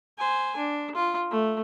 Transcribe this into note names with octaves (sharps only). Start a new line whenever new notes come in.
C5 G#5
D4
F4
A3